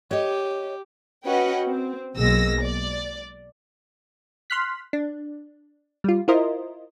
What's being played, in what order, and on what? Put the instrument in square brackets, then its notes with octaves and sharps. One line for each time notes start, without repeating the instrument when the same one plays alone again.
[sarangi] G4 [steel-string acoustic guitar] C#5 D#5
[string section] C#4 F#4 B4 D#5 F#5 G5
C4
B1 B2 G#3 A#3 E6 A#6
D5
[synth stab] C6 F6 F#6 B6
D4
G3 F4
E4 F4 A#4 C5 D#5